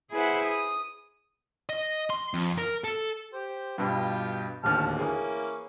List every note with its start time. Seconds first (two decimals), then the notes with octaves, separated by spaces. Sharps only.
0.12 E4 G#4 B4 C5 E5 F#5
0.44 D#6
1.69 D#5
2.10 C6
2.34 F2
2.58 A#4
2.84 A4
3.33 G4 C5
3.78 G2 B2 F4 G4 G5
4.64 D1 D#2 D3 B3 A5 F6
4.99 E3 A#3 C#4 G#4